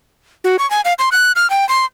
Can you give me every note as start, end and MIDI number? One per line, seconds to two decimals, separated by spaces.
0.44 0.57 66
0.59 0.69 85
0.71 0.81 80
0.85 0.93 77
0.99 1.09 84
1.12 1.32 90
1.36 1.49 89
1.50 1.67 79
1.69 1.85 84